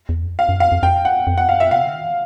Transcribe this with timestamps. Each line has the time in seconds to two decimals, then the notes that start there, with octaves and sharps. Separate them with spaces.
0.09 E2
0.23 F2
0.39 F5
0.49 F#2
0.60 F2 F5
0.72 F2
0.83 F2 G5
1.05 F#5
1.27 F2
1.38 F#5
1.49 F#2 F5
1.60 E5
1.71 C3 F5
1.83 D3
1.94 D#3
2.05 E3